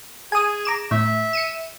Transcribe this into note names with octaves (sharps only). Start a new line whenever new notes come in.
G#4 G#5 D#6
A#5 D6 E7
A2 E5
C#7 D#7 E7